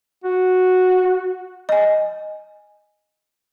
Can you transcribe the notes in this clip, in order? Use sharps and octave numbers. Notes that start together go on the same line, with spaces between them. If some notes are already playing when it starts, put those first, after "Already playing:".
F#4
D#5 G#5